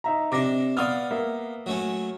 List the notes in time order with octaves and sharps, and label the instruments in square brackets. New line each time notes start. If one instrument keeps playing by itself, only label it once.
[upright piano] D#4 E5 A#5
[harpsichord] C3 D4 [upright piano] D6 A#6
[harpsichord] B3 F5 [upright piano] D5 D#6 F6
[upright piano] A#3 E5
[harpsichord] F#3 A3 C#4